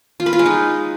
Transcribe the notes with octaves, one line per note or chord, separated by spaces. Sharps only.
F4
B4
F4
G#3
D#4